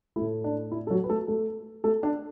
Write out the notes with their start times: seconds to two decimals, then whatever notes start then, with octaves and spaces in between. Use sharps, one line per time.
0.16 A3 E4
0.21 A2
0.44 D4
0.72 E4
0.87 A4
0.91 F#3 F#4
1.04 B4
1.09 A3 A4
1.28 A3 A4
1.84 A3 A4
2.03 D4 D5